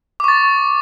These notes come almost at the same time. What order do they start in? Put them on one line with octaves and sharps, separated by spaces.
D6 C#6 A6